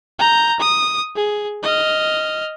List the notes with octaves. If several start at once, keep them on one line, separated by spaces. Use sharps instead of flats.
A#5 G6
D#6
G#4
D#5 F6